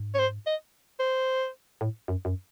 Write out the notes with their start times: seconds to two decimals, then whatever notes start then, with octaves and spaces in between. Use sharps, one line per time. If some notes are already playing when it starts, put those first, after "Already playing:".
Already playing: G#2
0.14 C#5
0.18 C5
0.47 D#5
0.99 C5
1.81 A2
2.08 F#2
2.25 F#2